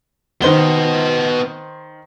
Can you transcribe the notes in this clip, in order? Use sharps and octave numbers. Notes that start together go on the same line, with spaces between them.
D#3 B3 C5 D#5 G7